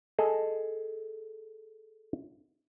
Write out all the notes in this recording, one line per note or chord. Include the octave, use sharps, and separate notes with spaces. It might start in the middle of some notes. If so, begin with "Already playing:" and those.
G#4 A4 D#5